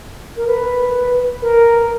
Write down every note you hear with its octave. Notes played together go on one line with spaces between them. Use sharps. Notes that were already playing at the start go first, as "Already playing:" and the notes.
A#4
B4
A#4